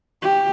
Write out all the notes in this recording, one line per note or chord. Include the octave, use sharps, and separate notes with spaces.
G4